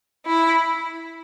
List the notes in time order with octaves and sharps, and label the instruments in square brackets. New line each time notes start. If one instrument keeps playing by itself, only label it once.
[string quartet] E4